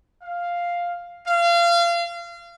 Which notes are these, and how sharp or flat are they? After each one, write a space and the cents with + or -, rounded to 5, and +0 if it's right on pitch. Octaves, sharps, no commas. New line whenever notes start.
F5 +0
F5 -30